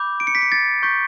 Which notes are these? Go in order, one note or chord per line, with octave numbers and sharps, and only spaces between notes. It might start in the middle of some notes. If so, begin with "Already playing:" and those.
Already playing: B5 D6 G6
D7
C#7
B6
C#7
A6
C#6 G6 B6